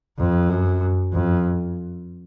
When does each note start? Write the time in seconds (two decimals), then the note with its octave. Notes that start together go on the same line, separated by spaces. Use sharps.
0.18 F2
0.50 F#2
1.13 F2